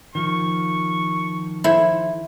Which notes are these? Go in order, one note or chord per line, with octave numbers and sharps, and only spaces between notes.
D#3 F3 C#6
E4 A4 C5 E5